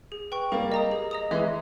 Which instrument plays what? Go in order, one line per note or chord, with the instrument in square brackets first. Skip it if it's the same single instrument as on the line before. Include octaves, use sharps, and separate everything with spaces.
[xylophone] G#4
B4 G5 C#6
[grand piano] G3 A#3 [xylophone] G#4
[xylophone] D#5 A#5 D#6
G#4
D#5 A#5 D#6
[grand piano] E3 G#3 [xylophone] E5